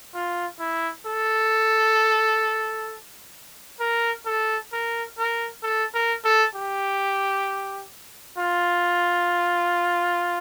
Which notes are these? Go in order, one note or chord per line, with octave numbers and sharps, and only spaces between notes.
F4
E4
A4
A#4
A4
A#4
A#4
A4
A#4
A4
G4
F4